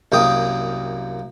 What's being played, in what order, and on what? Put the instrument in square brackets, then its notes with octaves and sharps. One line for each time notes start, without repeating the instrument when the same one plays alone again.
[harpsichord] C2 F#2 A#3 G5 D#6